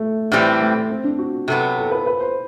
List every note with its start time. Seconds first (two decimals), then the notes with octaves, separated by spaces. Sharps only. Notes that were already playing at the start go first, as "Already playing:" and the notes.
Already playing: A3
0.32 A2 E3 G3 C4
0.61 A3
0.90 C4
1.04 D4
1.19 F#4
1.48 C3 F#3 B3 A4
1.78 A4
1.91 B4
2.06 B4
2.20 C5